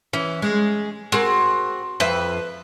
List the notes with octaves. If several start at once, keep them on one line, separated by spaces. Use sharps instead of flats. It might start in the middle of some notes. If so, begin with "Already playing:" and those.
E3 C#4
G#3
C4 F#4 G#4 A#4
F2 B4 C5 E5